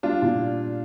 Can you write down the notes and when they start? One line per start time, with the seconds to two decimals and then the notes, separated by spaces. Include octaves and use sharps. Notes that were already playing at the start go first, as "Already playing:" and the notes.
0.03 G3 D4 F4
0.22 A#2